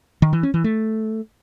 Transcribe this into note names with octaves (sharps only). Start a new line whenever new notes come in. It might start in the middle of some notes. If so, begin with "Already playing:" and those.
D#3
E3
C#4
E3
A3